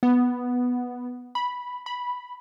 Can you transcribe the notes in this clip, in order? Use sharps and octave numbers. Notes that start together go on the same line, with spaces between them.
B3
B5
B5